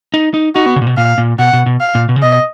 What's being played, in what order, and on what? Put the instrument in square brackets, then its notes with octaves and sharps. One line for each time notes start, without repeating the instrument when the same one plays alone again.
[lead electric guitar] D#4
D#4
[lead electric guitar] D#4 [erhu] F#4
[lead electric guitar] B3
C#3
A#2
B2
[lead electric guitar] A#2 [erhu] F5
[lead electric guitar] A#2
[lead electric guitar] B2 [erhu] F#5
[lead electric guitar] B2
B2
[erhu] F5
[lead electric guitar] A#2
B2
C#3
[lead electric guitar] B2 [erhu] D#5